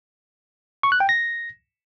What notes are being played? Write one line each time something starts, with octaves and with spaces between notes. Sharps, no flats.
C#6
F#6
G5
A#6